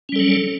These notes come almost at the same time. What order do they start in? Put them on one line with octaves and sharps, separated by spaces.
C#4 G3 A4 F#3